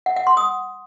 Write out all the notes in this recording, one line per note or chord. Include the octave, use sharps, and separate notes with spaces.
F#5
F#5
C6
D#6